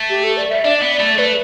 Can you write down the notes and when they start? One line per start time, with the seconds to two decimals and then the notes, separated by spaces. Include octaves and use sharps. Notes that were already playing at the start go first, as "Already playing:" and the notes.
Already playing: A3
0.10 G4
0.24 A4
0.37 D5
0.50 E5
0.65 D4 D5
0.82 B3
0.92 D5
1.01 A3
1.19 A3 B4